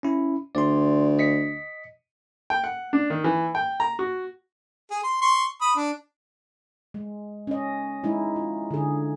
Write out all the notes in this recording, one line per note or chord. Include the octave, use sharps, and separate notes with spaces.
C#4 E4
D2 D5 C6
D#5 B6 C#7
G5
F#5
D4
D#3
E3
G5
A#5
F#4
G#4
C6
C6 C#6
B5 D#6
D4
G#3
C#4 D#5
G#3 D#4 E4
F4
D3 G#4